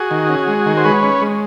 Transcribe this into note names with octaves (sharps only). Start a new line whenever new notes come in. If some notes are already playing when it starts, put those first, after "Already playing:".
Already playing: F#4 G#4
D#3
C#4
G#3
D#3
C5
G#3 B4 C#5
C#4
G#3